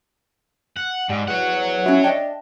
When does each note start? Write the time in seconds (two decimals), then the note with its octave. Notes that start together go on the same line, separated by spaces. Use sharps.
0.77 F#5
1.09 G#2 G3
1.28 E2 C#5 F#5
1.86 C#4 E4 F#4
2.04 D4 D#5 E5 G5